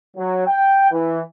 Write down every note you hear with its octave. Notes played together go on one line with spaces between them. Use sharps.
F#3
G5
E3